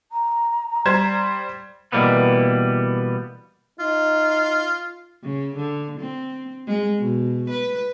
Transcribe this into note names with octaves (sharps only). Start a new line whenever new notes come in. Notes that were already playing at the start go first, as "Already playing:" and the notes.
A#5
G3 C5 G#6
B2 E3 G3 A#3 B3
D#4 F4
C#3
D3
C4
G#3
B2
B4